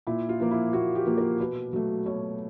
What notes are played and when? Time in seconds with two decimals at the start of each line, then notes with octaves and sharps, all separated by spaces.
0.07 A#2 E4
0.29 F4
0.40 F3 A#3
0.51 E4
0.73 A#2 F#4
0.95 G4
1.07 F3 A#3
1.18 A#4
1.40 B2 B4
1.73 F#3 A3
2.06 B2 C#5